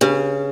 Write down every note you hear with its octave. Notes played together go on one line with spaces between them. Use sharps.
C#3 D4 G4 B4